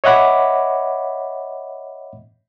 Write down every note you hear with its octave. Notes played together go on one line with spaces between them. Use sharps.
C#5 D#5 E5 F#5 B5 D6